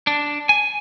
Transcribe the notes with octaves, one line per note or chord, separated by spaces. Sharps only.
D4
G#5